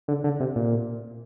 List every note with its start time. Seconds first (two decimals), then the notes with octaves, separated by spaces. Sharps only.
0.08 D3
0.24 D3
0.40 C3
0.56 A#2